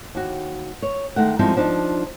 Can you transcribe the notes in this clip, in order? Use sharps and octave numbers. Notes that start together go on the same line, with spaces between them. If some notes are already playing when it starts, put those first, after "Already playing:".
D#2 F#4
C#5
D#3 G#3 A3 F#5
F3 G3 G#3 C4 D#4 E4
F3 D4 D#4